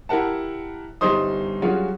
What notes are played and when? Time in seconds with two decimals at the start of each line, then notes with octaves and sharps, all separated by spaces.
0.09 E4 G4 A#4 F#5 A5
1.01 G1 G3 D#4 C5 C6 D#6
1.62 F#3 G3 C#4 F4 F#4 G#4